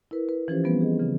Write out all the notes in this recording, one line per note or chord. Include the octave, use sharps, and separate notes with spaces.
E4 A#4 B4
B4
E3 F3 C#4 F4 G4 C5
F3 G3 B3 C4 B4
G#4 D#5
C#3 E3